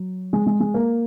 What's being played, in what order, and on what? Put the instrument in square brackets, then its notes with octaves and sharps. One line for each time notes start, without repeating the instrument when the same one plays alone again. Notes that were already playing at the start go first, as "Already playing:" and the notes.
Already playing: [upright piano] F#3
G#3
G#3
G#3
A#3